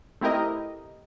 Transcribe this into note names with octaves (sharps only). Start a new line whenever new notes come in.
A3 C4 E4 G4 A#4 D#5